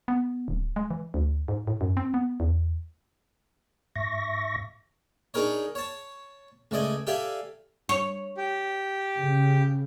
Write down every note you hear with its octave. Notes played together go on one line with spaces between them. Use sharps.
B3
D1
G#3
E3
D2
G#2
A2
F#2
C4
B3
E2
G#2 E5 C#6 A#6
D4 D#4 G#4 A#4 C#5
C#5 A5
C#2 A3 D5 D#5 G#5
G4 A4 D5 E5 F5 G#5
C#5
G4
C#3